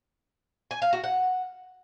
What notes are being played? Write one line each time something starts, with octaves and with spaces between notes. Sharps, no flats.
G#5
F5
F#4
F#5